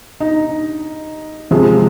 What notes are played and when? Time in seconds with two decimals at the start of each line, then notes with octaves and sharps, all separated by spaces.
0.20 D#4
1.51 C3 F3 G#3